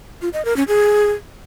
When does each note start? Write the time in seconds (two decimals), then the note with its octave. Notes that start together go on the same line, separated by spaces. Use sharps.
0.22 F4
0.33 D#5
0.45 A#4
0.56 C#4
0.68 G#4